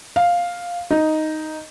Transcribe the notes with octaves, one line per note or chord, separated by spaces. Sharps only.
F5
D#4